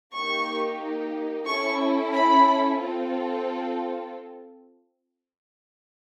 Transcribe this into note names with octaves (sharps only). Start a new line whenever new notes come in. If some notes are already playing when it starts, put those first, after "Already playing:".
A#3 D#4 G4 C#6
C#4 E4 A4 C#6
B5
C4 F4 A4